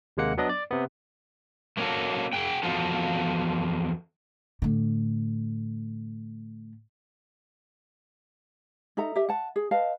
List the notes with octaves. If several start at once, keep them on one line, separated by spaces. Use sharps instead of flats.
D#2 C3 G#3 A#3 F#5 C#7
F#3 B3 D4 D#5
D5
C3 B3
A3 A#3 C#4 F#4 A4
G#4 F#5 G5
E2 F3 F4 F#4 A4
A2 D3
D#4 A4 E5 A#5
G4 E5
F#5 A5
G#4
B4 D#5 F5 A5